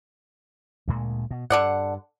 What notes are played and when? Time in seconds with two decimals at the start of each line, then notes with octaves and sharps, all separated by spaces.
0.88 D2 A#2 G#3
1.31 B2
1.50 G2 D3 D5 F#5